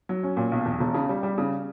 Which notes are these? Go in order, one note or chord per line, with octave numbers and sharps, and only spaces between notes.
F#3
C#4
A#2
B1
E2
E1
C#3
G3
G3
C#3